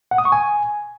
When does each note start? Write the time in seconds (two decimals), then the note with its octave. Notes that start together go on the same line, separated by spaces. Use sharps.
0.11 F#5
0.18 D#6
0.25 C#6
0.32 G#5